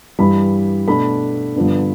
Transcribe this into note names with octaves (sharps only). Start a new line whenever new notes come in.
G2 E3 G3 B5
B2 A3 D4 B5
G2 D3 F3 B3 D4